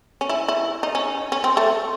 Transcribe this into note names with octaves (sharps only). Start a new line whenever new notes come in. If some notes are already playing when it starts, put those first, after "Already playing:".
C#4
E4
E4
D#4
C#4
C#4
C4
A3